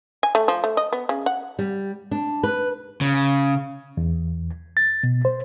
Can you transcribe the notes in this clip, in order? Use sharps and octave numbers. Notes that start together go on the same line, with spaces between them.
G#5
A3
F3
A3
D#5
B3
C#3
F#5
G3
D4
B4
C#3
E2
A6
B2
C5